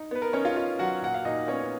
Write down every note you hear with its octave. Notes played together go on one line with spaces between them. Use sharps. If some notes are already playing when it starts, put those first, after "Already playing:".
Already playing: D#4
B3 B4
A#4
C#4 D#4 C#5
F4 F5
D#4 F4 F5
F#3 F#4 F#5
A#2 F#5
F5
A#2 D#4 D#5
B3 C#4 C#5